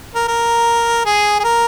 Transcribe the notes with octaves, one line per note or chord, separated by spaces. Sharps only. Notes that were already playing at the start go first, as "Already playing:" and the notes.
A#4
A#4
G#4
G#4
A#4